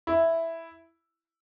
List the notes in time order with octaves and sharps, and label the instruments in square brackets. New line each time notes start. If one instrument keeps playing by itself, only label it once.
[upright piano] E4